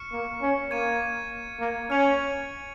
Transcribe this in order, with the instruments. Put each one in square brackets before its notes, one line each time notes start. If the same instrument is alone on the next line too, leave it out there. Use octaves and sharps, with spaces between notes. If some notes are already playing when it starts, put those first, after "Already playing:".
Already playing: [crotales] C#6 F6 C#7
[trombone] A#3
C#4
[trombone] A#3 [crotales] C#6 G#6 D#7
[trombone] A#3
[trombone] C#4 [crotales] F6 C#7 F7